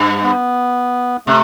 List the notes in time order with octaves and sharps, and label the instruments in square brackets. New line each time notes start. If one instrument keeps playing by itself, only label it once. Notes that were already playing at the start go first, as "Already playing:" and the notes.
Already playing: [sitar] G2
[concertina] B3
[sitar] C3 [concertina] A3